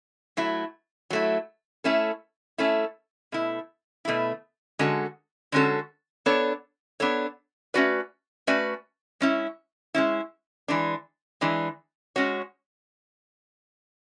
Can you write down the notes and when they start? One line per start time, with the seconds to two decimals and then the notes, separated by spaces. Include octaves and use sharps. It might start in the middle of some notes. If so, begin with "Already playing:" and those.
0.37 F#3 A3 E4
1.10 F#3 A3 E4
1.84 A3 C#4 E4 A4
2.58 A3 C#4 E4 A4
3.32 B2 A3 E4
4.05 B2 A3 E4
4.79 D3 G#3 C#4 F#4 A4
5.52 D3 G#3 C#4 F#4 A4
6.26 B3 D4 A4 C#5
7.00 B3 D4 A4 C#5
7.74 A3 C#4 F#4 B4 D5
8.47 A3 C#4 F#4 B4 D5
9.21 G#3 C#4 E4
9.94 G#3 C#4 E4
10.68 E3 G#3 D4
11.41 E3 G#3 D4
12.16 G#3 C#4 F#4 C#5